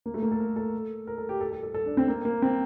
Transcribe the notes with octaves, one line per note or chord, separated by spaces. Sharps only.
A#3
A3
A#3
A4
A#4
A4
A#4
A4
G4
A4
A4
A4
A4
D4
C4
A#3
A#3
C4